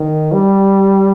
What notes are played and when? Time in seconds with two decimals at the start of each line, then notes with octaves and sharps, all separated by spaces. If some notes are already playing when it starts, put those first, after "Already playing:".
Already playing: D#3
0.33 G3